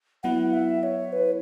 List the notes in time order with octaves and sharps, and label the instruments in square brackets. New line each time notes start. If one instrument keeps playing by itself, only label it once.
[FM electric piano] F#3 B3 E4 [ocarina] F#5
[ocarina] E5
C#5
B4